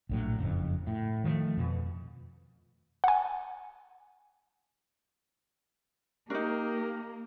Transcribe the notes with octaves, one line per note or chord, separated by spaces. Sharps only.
A#1 A2 F#3
F#1 F2
A2
D#3 F3 G#3 A3
F2 B2
F#5 G#5
A#3 D4 D#4 G4 A#4